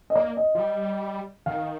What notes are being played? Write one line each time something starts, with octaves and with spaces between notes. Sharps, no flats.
D#5
A#3 D5
D#5
F3
G3
D#3 F5